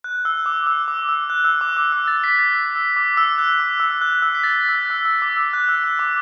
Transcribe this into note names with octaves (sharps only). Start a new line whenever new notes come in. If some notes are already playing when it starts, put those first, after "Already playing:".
F#6
E6
D6
E6
D6
E6
F#6
E6
D6
E6
E6
A6
B6
A6
E6
E6
D6
E6
F#6
D6
E6
F#6
E6
B6
A6
B6
E6
F#6
E6
E6
D6
E6
F#6
E6
E6
D6